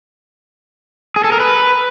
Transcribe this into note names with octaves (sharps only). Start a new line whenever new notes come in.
G#4
A4
A#4
B4